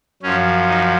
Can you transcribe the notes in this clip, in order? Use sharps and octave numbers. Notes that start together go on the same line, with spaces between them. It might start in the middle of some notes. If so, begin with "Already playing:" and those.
F#2 F3 C#4
D#4